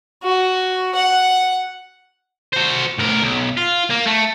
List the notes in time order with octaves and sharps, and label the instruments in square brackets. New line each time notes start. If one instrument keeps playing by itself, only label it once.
[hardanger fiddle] F#4
F#5
[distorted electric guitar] F#4 C5
D2 A#4
B1
F4
A#3
A3